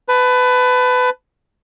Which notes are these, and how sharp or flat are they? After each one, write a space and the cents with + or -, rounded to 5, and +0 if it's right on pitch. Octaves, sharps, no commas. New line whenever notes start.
B4 +20 A5 +0